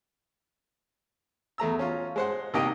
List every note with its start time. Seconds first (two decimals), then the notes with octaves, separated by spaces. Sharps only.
1.58 E2 A3 A#5 E6
1.79 C#4 F4
2.16 G#3 C5 F#5
2.54 C2 A#3 D#4 G4 D#5 G5